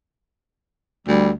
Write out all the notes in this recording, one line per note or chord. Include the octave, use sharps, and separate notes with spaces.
D2 G3